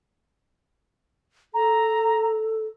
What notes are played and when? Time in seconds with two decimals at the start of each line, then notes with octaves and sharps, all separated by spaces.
1.54 A4 A#5